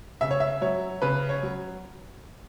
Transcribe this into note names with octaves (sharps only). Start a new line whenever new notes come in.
C#3 E5
C#5
E5
F#3 C#5
C#3 B4
C#5
F#3